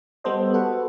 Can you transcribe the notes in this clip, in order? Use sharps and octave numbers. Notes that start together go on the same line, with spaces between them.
G3 B3 A4 C5 D#5
F#4 A4 B4 F#5